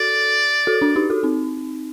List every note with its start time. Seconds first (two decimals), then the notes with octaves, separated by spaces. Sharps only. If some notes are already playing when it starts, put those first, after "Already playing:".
Already playing: F#4 A4 D5
0.67 F#4 A4
0.82 D4 F#4
0.96 D#4 G4
1.10 F#4 A4
1.23 C4 D#4